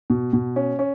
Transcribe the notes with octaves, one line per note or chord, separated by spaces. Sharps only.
B2
B2
C#4
C#4